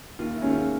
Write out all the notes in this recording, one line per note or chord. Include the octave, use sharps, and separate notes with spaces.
D#2 F4
E4
D#3 G#3 C#4
F4